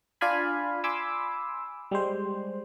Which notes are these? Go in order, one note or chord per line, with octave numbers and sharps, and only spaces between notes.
D4 F4 D5 F5 G#5 B5
G#5 B5 C6 D6 E6
G3 G#3 C5